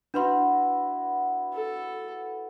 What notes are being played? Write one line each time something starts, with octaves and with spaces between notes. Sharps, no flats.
B3 D4 E4 F#4 B4 C6
A4